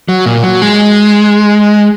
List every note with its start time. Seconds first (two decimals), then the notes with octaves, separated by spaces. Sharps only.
0.09 F#3
0.26 A#2
0.43 F#3
0.62 G#3